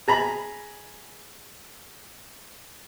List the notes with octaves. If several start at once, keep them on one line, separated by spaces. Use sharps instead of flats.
G#4 A#5 B5